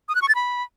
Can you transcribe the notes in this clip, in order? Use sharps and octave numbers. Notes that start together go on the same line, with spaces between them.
D#6
F#6
C#6
A6
B5